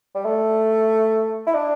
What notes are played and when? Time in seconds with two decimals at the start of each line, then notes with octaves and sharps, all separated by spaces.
0.15 G3
0.25 A3
1.47 E4
1.54 D4